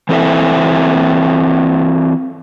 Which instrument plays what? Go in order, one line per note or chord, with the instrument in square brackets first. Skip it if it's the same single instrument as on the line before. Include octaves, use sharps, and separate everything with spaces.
[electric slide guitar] E3 C4 E4 A4 C5 E5